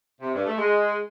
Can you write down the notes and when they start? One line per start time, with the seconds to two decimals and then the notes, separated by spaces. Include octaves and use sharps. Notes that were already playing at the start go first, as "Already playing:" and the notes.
0.21 C3
0.33 G2
0.45 A3
0.56 G#3